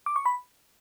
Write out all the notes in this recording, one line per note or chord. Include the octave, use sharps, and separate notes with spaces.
D6
C#6
B5